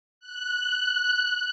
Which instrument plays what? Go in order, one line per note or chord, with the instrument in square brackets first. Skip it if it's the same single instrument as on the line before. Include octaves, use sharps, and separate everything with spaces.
[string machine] F#6